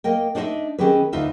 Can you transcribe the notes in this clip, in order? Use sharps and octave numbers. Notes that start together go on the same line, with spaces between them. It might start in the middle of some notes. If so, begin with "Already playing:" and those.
A#3 A#4 D#5 G5
D4 D#4 F#4 C5 D#5 E5
D#3 C4 C#4 G4 G#4 B4
D2 D#4 F4 B4 E5